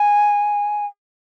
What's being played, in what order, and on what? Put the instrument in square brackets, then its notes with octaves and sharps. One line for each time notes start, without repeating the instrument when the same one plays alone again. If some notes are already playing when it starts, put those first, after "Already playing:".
Already playing: [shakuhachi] G#5